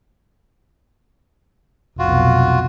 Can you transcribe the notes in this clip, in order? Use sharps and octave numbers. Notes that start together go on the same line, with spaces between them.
F1 B1 F4 F#4